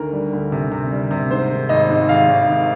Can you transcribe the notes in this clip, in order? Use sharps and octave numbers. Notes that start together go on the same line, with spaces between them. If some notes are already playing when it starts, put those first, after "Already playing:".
Already playing: D2 D#3 A#4
G3
D2
C3
C3
G3
C3
G#2 C5
D#3
G#1 D#5
G#2
G#1 F5
G#1
D#3